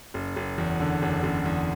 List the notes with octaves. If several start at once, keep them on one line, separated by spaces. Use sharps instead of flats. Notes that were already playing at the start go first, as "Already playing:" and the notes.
F#1
F#1
E2
D3
F#1
F#1
E2